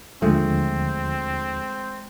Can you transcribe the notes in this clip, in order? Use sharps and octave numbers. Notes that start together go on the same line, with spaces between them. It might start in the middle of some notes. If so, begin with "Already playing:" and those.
D#2 D3 F3 G#3 A3 C4